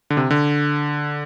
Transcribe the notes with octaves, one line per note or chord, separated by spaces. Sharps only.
D3
C3
D3